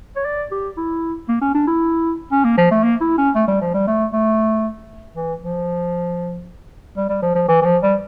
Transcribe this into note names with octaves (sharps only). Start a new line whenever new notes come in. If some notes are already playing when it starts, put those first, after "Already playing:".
C#5
D5
G4
E4
A#3
C#4
D4
E4
C#4
A#3
F3
A3
A#3
E4
C#4
A3
G3
F3
G3
A3
A3
E3
F3
G3
G3
F3
F3
E3
E3
F3
G3